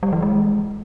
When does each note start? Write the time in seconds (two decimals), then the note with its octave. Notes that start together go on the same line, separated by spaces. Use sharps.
0.03 G3
0.13 E3
0.22 G#3